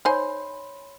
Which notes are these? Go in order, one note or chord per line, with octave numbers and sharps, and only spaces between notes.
D#4 C5 C#5 G#5 B5 C6